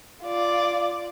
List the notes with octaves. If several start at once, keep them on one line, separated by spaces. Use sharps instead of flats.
F4 D5